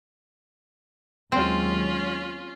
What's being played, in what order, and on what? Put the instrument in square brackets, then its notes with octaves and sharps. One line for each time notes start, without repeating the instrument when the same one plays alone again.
[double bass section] D#2 F#3 G#3 [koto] C4 [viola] C#4 F4